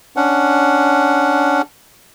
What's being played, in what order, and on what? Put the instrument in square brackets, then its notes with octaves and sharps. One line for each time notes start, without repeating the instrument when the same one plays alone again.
[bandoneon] C#4 D4 F#5